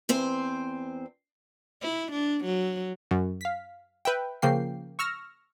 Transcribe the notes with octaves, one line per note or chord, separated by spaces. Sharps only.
E2 C4 C5
E4
D4
F#3
F#2
F5 B6
B4 E5 G5
C#3 F3 A#3 G5 C7
C#6 E6 F6 A#6